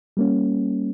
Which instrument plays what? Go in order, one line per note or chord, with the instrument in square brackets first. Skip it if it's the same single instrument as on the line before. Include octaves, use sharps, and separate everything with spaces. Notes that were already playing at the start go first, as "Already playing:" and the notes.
[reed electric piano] G3 A#3 C#4